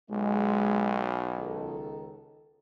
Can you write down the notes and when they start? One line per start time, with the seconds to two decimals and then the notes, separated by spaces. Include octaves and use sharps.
0.10 B1 G#3
1.38 C#2 D#3 A4